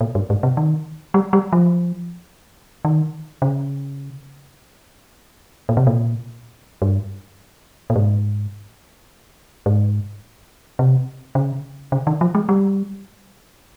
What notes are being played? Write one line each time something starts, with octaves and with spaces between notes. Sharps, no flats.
A#2
G2
G#2
C3
D#3
G3
G3
F3
D#3
C#3
A#2
C3
A#2
G2
A#2
G#2
G#2
C3
C#3
C#3
D#3
F3
G#3
G3